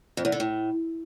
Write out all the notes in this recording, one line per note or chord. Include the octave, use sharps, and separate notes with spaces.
F2
E2
D3
A2